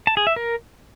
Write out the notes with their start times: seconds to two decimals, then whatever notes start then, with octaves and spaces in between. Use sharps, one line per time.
0.07 A5
0.17 G#4
0.27 E5
0.36 A#4